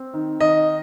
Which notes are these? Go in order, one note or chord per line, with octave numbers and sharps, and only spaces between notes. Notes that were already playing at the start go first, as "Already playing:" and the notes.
Already playing: C4
D#3
D#3 D#5